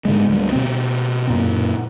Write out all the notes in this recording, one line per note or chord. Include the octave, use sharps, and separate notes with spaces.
G#2 D3 G#3
D2 G3
B2 C4
F#2 A#2